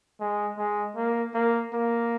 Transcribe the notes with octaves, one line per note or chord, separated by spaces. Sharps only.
G#3
G#3
A#3
A#3
A#3